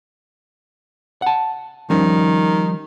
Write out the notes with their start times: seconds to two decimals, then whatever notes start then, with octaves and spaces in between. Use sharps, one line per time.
1.22 F#5 A5
1.90 D#3 F3 G3 C#4